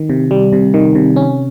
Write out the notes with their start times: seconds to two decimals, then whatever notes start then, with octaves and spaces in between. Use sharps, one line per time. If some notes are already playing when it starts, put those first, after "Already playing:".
Already playing: D#3
0.10 C3
0.31 G3
0.53 C3
0.74 D#3
0.95 C3
1.16 C#4